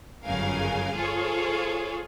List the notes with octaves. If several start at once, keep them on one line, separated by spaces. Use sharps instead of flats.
G1 F#2 C#3 A#4 F5 G#5
F4 G#4 A4 C5 C#5